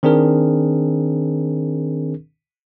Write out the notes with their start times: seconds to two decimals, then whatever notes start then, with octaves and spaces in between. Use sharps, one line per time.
0.03 D#3 C4 D4 G#4 A#4